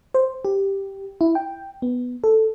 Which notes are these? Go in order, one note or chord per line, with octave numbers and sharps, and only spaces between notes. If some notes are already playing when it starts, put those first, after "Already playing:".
C5
G4
E4
G5
B3
A4